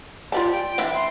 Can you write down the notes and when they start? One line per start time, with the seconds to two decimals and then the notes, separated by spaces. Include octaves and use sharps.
0.32 F4 G4 D5 A5
0.52 G5
0.78 E3 D4 E4
0.94 C6